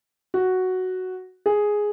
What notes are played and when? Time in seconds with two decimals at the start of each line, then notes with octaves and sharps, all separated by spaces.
0.34 F#4
1.46 G#4